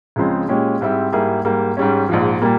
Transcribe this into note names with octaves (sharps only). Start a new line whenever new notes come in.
C#2 C#3 F3 G#3 C4
A#2 G#3 C#4 G4
G#2 G3 C4 E4
G#2 G3 A#3 E4 G#4
G#2 G3 A#3
G#2 G3 C#4
A#1 G#2 F3
A#2 G3 A#3